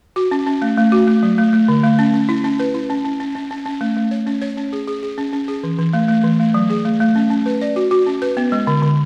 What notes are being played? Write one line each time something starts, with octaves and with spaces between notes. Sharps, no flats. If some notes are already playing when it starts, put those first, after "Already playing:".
F#4
C#4
C#4
A3
A3
F#4
A3
F#3
A3
A3
D3
A3
C#4
C#4
E4
C#4
B4
E4
C#4
C#4
C#4
C#4
C#4
C#4
A3
A3
C#5
C#4
C#5
C#4
G#4
G#4
G#4
C#4
C#4
G#4
E3
E3
A3
A3
E3
A3
F#3
G#4
A3
A3
C#4
C#4
B4
D5
F#4
F#4
C#4
B4
B3
G#3
D3
D3